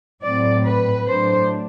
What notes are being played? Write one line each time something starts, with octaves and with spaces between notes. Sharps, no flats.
A2 F#3 C4 D5
B4
A2 F#3 A3 D4 C5